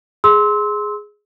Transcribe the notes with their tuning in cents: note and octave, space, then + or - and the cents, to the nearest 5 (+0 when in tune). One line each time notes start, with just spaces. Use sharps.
G#4 +0 C6 +0 E6 -30